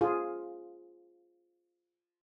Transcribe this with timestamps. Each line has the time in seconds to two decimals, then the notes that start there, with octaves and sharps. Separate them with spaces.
0.01 F4 G#4